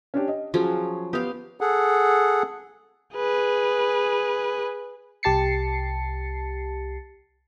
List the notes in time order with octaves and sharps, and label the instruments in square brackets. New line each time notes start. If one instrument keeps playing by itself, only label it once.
[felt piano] C#4 D4 G4
D#5
[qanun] F3 F#3 C#4 [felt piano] G#4
[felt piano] B3 D#6 [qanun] G4 F5
[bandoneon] G#4 A4 F#5
[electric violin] G#4 B4
[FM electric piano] C2 G4 A5 A6 C7 C#7